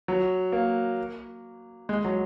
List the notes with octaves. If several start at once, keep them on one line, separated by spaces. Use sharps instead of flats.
F#3
A#3
G#3
F#3